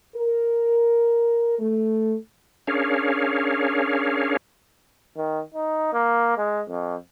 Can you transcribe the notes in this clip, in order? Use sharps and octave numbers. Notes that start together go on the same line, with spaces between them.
A#4
A3
C#4 D4 G#4 A#4 C#5 F5
D#3
D#4
A#3
G#3
F2